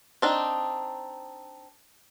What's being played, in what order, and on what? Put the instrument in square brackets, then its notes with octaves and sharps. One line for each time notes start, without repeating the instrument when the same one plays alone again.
[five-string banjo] C4 D4 D#4